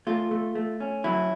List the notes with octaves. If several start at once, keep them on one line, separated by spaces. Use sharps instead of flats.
A3 F4
A3
A3
C#4
F#3 E4